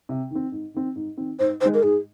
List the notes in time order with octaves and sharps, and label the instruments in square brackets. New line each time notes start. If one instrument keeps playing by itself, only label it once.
[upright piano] C3
D#3 C4
G#2
D#3 C4
G#2
D#3 C4
[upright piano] G#2 [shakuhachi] C5
[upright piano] D#3 G#3 [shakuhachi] C5
[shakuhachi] A#4
[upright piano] G#2 [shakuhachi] G#4